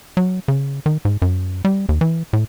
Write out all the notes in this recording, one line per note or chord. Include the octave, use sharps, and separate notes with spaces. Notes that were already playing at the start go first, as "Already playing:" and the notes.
F#3
C#3
D#3
G#2
F#2
G3
D#2
E3
A2